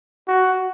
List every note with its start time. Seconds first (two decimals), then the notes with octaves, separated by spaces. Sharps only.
0.28 F#4